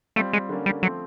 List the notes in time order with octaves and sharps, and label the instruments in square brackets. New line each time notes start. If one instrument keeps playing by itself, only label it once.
[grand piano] G3 C4 F4 [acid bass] A3
[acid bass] G#3
[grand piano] D3 G3 A#3 C#4
[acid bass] G3
[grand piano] F3 A3 C4 [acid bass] F#3